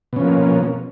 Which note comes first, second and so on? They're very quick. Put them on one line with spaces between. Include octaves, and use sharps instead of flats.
B2 C#4 F3 A#3